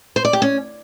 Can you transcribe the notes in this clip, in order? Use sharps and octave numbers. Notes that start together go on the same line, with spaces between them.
C5
D5
G4
C#4